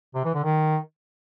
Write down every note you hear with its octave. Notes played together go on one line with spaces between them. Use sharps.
C3
E3
D3
D#3